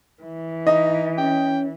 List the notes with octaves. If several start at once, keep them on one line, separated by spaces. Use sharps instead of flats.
E3
D#4 D#5
C#4 G5